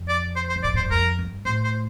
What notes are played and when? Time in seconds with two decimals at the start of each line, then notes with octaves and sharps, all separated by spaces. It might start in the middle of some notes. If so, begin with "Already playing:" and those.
Already playing: F2
0.09 D5
0.36 C5
0.49 C5
0.56 C3
0.63 A#2 D5
0.74 A2 C5
0.83 G2
0.91 F2 A#4
1.19 G2
1.45 A2 C5
1.64 C5